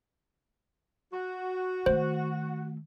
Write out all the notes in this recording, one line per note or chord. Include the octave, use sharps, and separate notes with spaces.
F#4
D#3 A3 C5